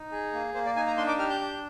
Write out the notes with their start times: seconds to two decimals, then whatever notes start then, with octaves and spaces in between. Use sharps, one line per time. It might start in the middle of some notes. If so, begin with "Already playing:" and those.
Already playing: D#4
0.12 G#4
0.33 A#3
0.54 A#3 C5
0.66 D5
0.76 D#4 G#5
0.87 A#5
0.98 D4 C6
1.08 D6
1.18 G4 F6
1.30 G6
1.41 D4